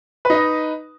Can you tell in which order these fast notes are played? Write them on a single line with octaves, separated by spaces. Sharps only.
B4 D#4 D#5